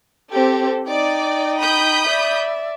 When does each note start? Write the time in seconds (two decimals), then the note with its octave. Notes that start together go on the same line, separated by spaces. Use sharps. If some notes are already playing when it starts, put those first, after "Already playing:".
0.32 C4 G4 A4
0.88 D#4 D5 G5
1.61 B5 D#6 G6
2.07 D5 E5